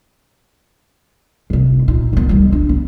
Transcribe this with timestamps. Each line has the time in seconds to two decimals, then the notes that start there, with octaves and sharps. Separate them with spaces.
1.50 G1 C3
1.88 A#2 D#4
2.13 D#3 B3
2.29 C#2 G3
2.52 D4
2.69 B3